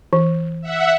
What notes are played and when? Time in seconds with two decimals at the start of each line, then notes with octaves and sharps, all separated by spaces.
0.13 E3
0.61 E5 F#5